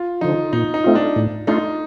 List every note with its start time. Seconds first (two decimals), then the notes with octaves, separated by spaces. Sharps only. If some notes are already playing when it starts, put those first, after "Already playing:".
Already playing: F4
0.21 D3 F3 D#4
0.53 A#2 D#4
0.74 D#4
0.84 A3 C4 F4
0.95 D4
1.16 A2
1.47 A3 D4 D#4 F4